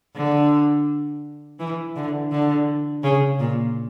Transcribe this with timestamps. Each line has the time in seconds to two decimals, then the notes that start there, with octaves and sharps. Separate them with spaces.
0.15 D3
1.60 E3
1.96 D3
2.31 D3
3.03 C#3
3.39 A#2